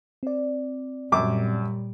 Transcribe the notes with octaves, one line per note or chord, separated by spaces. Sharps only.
C4 D5
F#2 A#2 G3 D6